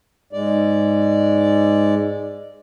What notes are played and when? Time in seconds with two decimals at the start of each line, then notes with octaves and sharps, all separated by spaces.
0.33 G#2 G#3 D5